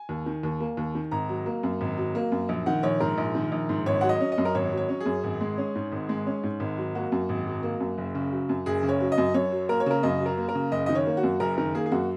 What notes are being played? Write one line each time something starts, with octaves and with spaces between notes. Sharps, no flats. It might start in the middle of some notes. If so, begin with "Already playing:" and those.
Already playing: G#5
D#2
D#3
D#2
A#3
D#2
D#3
G#1 A#5
F#3
A#3
F#2
G#1
F#3
A#3
F#2
A#1
D#3 F#5
A#1 C#5
G#2 A#4
A#1
D#3
A#1
G#2
G#1 C#5
F#3 F#5
D#5
C#4
D#5
F#2
A#4
G#1 C#5
F#3
C#5
C#4
G#4
F#2
G#1
G#3
C#4
G#2
G#1
G#3
C#4
G#2
G#1
F#3
A#3 F#4
F#2
G#1
F#3
A#3
F#2
F#1
C#3
F#3
F#2
F#1 G#4
C#3
C#5
F#3
D#5
F#2
F#2 C#5
F#3
A#3 A#4
C#5
C#3 A#4
F#2 D#5
F#3
A#4
A#3
A#4
C#3
F#1 D#5
D#3 D#5
C#5
A#3
F#4
F#2
F#1 A#4
D#3 A#4
A#3 G#4
G#4
F#2 F#4